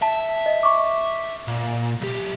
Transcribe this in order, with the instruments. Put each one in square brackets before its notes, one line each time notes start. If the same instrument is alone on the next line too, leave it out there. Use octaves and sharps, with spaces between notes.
[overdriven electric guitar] E5 [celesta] A5
[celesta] D#5
C#6 D6
[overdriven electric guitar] A#2
B1 G4